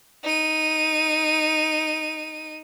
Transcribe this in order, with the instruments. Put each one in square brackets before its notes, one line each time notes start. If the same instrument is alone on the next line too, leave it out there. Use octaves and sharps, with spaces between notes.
[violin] D#4 D#7